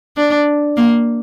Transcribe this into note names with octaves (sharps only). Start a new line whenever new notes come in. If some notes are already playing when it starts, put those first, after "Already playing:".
D4
A#3